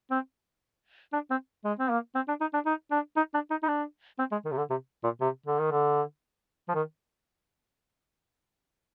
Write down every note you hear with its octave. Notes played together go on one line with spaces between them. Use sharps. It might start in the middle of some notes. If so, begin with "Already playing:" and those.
C4
D4
C4
G#3
C4
A#3
C4
D4
D#4
D4
D#4
D4
D#4
D4
D#4
D#4
D4
C4
G#3
D#3
C3
D3
C3
A#2
C3
D3
D#3
D3
F3
D#3